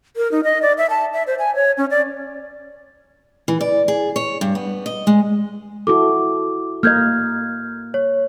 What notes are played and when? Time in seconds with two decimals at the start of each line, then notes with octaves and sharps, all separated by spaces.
0.16 A#4
0.32 D#4
0.44 D#5
0.62 D5
0.78 E5
0.90 A5
1.13 E5
1.27 C5
1.39 G#5
1.55 C#5
1.78 C#4
1.91 D5
3.48 E3
3.61 D5
3.88 G#4
4.16 C#5
4.41 G2
4.55 B3
4.86 D#5
5.07 G#3
5.87 E4 F#4 A4 D6
6.83 A#3 A#4 D#5 F6 G6 G#6
7.94 C#5